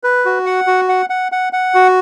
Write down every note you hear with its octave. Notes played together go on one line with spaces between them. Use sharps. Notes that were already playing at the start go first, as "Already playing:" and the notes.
B4
F#4
F#5
F#4
F#5
F#5
F#5
F#5
F#4